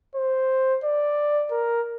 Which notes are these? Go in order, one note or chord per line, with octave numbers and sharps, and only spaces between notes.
C5
D5
A#4